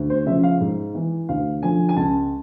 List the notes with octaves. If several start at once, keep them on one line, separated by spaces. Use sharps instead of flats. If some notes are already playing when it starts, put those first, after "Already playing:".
Already playing: D2
C5
C#3 F3 E5
F5
G#2
E3
D2 F5
D3 F3 G#5
G#5
C#2 A5